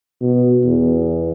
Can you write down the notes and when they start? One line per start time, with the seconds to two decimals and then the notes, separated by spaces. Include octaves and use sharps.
0.22 B2
0.65 E2